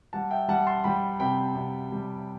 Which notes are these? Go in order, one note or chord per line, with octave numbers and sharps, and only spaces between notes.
G3 F#5 A5
E5 G5
G3 F#5 A5
A5 C6
G3 G5 B5
C3 G5 B5
C3
G3